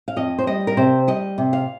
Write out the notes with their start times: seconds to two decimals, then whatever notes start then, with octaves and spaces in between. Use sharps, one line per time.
0.08 F5
0.16 F2 D#5
0.39 C5
0.47 G3 D#5
0.67 A#4
0.77 C3 C5
1.07 G3 D#5
1.38 C3
1.53 F5